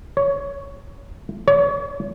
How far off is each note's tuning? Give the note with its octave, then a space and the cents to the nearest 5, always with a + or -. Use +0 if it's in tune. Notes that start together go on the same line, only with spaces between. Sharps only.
C#5 +10
C#5 +35